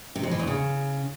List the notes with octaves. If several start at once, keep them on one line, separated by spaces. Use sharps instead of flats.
C3
F2
E3
E2
C#3